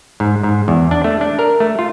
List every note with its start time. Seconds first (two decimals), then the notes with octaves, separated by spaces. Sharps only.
0.20 G#2
0.43 G#2
0.68 E2
0.91 D4
1.04 A3
1.21 D4
1.39 A#4
1.60 A3
1.79 F4